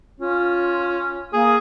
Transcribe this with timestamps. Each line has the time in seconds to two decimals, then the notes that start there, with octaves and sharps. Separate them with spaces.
0.20 C#4 F4
1.33 A#3 G#4